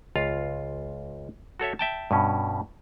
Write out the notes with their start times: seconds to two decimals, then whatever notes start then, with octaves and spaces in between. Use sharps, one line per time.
0.16 C#2 F4 F5
1.60 F#4 A4 C#5 E5
1.79 E5 G5 A5
2.11 G2 B2 C#4